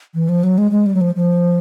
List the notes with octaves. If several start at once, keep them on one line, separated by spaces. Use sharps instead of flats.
E3
F3
F#3
G#3
G#3
G3
F#3
F3
F3